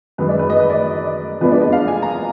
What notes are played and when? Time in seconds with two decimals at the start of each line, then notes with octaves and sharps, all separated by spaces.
0.18 F#2 D#3 G#3 B4
0.29 D5
0.39 B4
0.50 D#5
0.60 B4
0.70 D5
1.41 F2 F3 G#3 B3 D4 B4
1.52 D5
1.61 D#5
1.72 F5
1.88 G#5
2.02 A#5